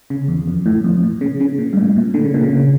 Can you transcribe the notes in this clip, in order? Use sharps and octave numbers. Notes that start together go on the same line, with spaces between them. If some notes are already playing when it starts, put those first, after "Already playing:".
C#3
E2
F2
A2
F2
A#2
C#3
C#3
A#2
G2
A2
A#2
D3
C#3
A#2
C#3